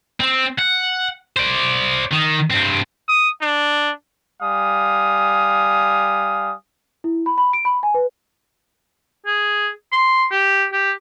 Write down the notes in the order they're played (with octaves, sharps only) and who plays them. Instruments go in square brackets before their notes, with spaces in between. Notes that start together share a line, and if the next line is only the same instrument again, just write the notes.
[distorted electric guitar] C4
F#5
C5 D5
D#3
G2 C4
[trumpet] D#6
D4
[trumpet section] G3 F5 G#5 D#6
[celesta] E4
B5
B5
D7
B5
G#5
B4
[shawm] G#4
C6
G4
G4